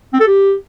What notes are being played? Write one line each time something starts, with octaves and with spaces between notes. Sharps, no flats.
C4
A4
G4